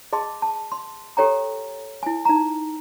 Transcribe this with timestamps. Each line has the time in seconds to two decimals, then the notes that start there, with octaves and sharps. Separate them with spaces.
0.13 G#4 D#5 A5 C6
0.42 A5
0.72 C6
1.17 G4 A4 C#5 G5 A#5
2.03 E4 G#5
2.25 D#4 A#5